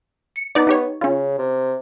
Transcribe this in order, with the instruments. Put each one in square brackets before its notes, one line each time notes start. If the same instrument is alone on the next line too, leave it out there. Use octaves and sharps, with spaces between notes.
[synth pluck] C#7
[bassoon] B3 [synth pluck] D#4 D5
[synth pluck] D#4 G4 C#5
[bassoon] C#3 [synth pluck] C#4 F4
[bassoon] C3